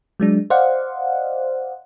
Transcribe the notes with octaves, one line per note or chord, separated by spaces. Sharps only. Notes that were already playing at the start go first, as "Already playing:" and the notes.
F#3 G#3 D4
C5 D5 D#5 F5 F#5